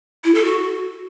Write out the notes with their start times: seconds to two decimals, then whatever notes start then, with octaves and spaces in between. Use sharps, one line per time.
0.24 E4
0.35 A4
0.45 F#4